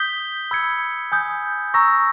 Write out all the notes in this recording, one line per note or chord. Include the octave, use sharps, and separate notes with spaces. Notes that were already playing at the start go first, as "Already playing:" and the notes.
Already playing: D#6 G6 B6 G7
B5 E6 G#6 C#7
G#5 D#6 G6
A#5 C#6 E6 A#6